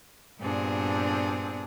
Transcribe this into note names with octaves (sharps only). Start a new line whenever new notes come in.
G2 A#2 B3 C4 D4 G#4